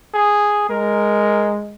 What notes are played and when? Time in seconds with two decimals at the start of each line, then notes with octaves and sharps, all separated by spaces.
0.14 G#4
0.70 G#3 A#4